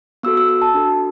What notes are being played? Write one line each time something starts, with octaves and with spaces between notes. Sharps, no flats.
B3 F#4 A4 E6
E6
E6
A5
D4 F#4 A4